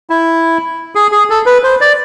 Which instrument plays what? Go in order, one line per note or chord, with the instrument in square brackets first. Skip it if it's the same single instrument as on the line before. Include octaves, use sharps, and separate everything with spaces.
[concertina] E4
G#4
G#4
A4
B4
C5
D5